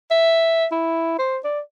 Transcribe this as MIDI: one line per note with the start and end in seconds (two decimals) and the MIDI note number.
0.11 0.66 76
0.71 1.16 64
1.19 1.38 72
1.44 1.60 74